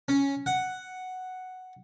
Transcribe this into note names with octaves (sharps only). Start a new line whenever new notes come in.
C#4
F#5